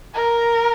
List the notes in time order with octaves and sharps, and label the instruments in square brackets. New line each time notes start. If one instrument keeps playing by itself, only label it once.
[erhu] A#4